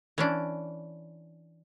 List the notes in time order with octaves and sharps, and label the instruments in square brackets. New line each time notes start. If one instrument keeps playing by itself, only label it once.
[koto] E3 C#4 D4